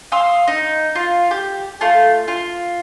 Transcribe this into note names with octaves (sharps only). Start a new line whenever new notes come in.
F5 C6 D#6 E6
D#4
F4
G4
A3 F4 A5
F4